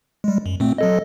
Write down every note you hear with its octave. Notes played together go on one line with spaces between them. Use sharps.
G3 G#3
F#2
A#2 A3 C4
F#3 A4 D#5